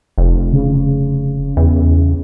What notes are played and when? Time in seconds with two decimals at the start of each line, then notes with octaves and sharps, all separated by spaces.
0.18 F1
0.53 C#3
1.57 E2